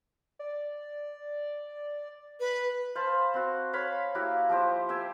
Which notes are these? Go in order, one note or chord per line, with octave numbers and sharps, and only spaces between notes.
D5
B4
C5 F5 A5 B5
C4 F#4
C#5 F5 B5 C6
A#3 E4 F#4 G4
F3 G4 C5
G4 E5 G5 G#5